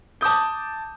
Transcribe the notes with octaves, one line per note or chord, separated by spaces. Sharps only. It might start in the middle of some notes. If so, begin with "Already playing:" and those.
A5 D6 D#6 G6